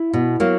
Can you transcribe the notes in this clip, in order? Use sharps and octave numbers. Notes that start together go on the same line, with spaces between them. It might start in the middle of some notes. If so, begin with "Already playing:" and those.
Already playing: E4
B2
F#3 A#3